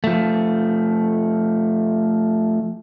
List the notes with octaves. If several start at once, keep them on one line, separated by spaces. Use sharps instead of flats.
F3 A3